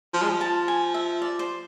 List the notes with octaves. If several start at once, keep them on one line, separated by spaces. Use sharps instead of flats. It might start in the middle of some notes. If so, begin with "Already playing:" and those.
F3
G#3
F3
A5
G#5
E5
D5
C5